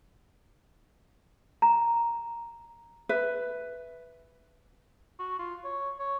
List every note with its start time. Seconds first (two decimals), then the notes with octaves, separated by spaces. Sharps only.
1.62 A#5
3.09 B4 E5
5.20 F#4
5.39 F4
5.64 C#5
5.99 C#5